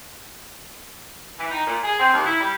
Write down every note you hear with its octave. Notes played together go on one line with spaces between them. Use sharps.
E3
D#4
A#2
G#4
C4
D#2
E4
G3